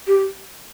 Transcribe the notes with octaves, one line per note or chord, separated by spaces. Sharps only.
G4